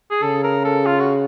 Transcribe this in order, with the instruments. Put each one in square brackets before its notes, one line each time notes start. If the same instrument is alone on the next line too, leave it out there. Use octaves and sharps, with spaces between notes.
[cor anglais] G#4
[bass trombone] C#3 [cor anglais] A4
[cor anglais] A#4
A4
F4
F#4